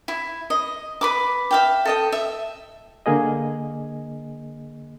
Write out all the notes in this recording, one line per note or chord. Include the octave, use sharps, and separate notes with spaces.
E4
D#5
B4 B5 D6
E5 F5 G5
A4 D#5 G5
E5
D3 A#3 G#4 D#5